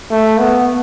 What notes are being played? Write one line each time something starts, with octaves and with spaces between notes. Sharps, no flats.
A3
B3